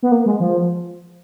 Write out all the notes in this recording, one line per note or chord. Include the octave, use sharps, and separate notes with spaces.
B3
A#3
G#3
F3